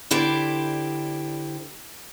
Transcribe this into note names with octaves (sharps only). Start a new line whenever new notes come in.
D3 E4 G4 C5 D5